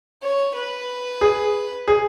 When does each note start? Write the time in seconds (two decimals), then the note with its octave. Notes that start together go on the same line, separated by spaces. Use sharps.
0.22 C#5
0.55 B4
1.21 G#4
1.88 G#4